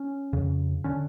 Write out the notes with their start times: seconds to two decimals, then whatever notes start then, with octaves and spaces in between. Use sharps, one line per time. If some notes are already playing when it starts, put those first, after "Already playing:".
Already playing: C#4
0.33 F2 C#3
0.84 D3 C#4